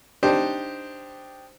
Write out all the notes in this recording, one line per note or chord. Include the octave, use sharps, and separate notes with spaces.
D4 D#4 G4 C5